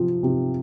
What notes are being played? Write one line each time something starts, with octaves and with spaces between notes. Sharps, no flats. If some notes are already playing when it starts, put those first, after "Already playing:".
Already playing: C3 F3 C4
C3